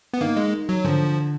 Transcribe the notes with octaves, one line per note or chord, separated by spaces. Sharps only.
B3
D#3 A#3
G#3
F#3
D3 F3